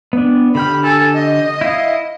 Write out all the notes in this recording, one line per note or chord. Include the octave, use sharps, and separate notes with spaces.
B3 D4
D3 G4 B5 F6
A4 G#5
D#5
E4 F5